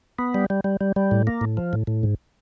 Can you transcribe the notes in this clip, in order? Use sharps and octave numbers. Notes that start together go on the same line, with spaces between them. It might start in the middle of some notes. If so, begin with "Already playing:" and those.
B3
G3
G3
G3
G3
G3
A2
A#3
A2
F3
A2
A2
G#2